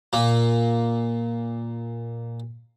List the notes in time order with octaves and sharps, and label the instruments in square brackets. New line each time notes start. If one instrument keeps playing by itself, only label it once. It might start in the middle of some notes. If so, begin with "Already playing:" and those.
[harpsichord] A#2 A#3